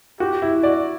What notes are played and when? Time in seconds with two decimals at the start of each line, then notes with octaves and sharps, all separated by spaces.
0.20 F#4 G4
0.42 E4
0.63 F#4 D5